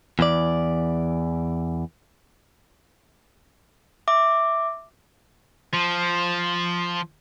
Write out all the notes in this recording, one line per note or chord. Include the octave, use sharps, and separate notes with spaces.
E2 E3 D5
E5 D6
F3